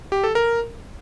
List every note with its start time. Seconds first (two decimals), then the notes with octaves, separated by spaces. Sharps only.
0.12 G4
0.24 A4
0.35 A#4